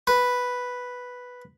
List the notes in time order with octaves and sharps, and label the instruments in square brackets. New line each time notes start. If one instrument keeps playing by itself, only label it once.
[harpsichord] B4